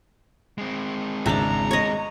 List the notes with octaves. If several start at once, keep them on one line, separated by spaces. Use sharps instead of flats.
G#3 C4
G#1 E2 C#3 D4 E5 A#5
C#5 D#5